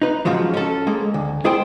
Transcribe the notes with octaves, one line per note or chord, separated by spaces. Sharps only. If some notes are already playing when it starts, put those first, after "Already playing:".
D#4 B4
G#2 C#3 F3 F#3 G#3
C#4 A4
G#3 A#3
D2
G#3 E4 G#4 A4 C5 G5